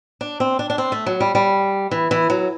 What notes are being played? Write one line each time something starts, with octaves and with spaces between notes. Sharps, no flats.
D4
C4
D4
D4
C4
A3
F#3
G3
G3
E3
E3
F#3